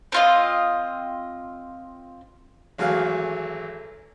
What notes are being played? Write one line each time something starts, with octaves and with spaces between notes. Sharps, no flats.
C4 F4 D#5
G#1 E3 F#3 A3 F5